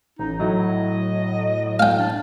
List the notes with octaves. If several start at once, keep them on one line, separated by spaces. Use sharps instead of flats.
A1 D#4
A2 F#3 D#5
F5 G5
D4